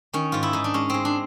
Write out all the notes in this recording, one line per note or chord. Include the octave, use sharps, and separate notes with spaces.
D#3 C#4
G#2 F4
E4
G#2 D#4
D4
G#3 C#4
G#3 C4
D4